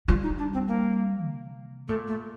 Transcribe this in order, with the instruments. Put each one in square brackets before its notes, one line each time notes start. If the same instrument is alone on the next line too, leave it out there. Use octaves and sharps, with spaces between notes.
[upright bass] G3 [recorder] F4
[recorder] D#4
D4
C4
A#3
[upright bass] C3
[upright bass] A#2 [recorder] A3
[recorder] A3